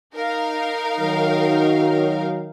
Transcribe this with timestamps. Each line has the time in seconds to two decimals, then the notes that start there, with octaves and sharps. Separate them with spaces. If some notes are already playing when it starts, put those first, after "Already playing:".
0.16 D#4 A#4 F5
0.99 D#3 F#3